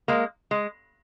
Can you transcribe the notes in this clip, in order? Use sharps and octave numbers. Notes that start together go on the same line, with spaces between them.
G#3 A#3
G#3